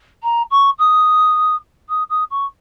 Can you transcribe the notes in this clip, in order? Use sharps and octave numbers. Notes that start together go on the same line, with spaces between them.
A#5
C#6
D#6
D#6
D#6
C#6